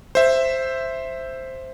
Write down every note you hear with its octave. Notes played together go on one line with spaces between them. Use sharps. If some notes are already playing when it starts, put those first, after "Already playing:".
C5 E5